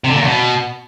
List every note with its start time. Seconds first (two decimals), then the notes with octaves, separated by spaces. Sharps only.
0.04 C3
0.10 D3
0.15 A#2
0.21 E2
0.26 B2